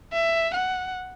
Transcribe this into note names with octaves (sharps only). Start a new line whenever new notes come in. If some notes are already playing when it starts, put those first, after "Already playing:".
E5
F#5